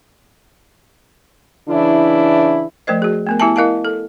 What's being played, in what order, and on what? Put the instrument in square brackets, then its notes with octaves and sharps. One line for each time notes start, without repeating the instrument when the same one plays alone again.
[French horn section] C#3 E3 D4 E4
[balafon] F3 A3 A#4 C5 D#5
F#4 G#4
A3 B3 A#4
B3 E4 G4 E5 G#5 A5
E4 A#4 D#5 F5 A5
A4